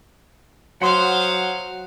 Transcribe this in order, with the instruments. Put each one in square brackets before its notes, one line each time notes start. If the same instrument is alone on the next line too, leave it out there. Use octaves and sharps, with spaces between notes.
[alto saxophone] F#3 [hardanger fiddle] C5 F5 [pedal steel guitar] F#5 C6 D#6